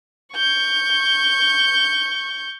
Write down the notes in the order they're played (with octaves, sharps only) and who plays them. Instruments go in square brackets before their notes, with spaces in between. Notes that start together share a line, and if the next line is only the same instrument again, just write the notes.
[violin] C#6 G6